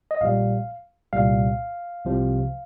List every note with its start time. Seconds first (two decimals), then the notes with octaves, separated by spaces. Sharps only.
0.11 D#5
0.21 A#1 A#2 G3 F5
1.13 C2 A#2 G3 F5
2.05 C2 C3 F3